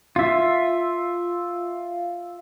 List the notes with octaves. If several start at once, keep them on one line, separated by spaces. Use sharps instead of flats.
F4 E5